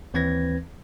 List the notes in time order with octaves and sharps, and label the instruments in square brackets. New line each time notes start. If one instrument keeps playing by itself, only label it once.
[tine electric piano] D#2 E3 C4 B4 G#6 A#6